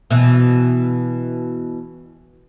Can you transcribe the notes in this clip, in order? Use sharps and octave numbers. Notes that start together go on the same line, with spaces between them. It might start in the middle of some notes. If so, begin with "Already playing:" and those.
B2 E3